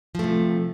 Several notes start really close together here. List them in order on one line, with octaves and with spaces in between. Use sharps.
F3 A3 C3